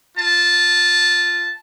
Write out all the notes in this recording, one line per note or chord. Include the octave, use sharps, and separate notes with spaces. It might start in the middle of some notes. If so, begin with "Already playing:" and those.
F4 A5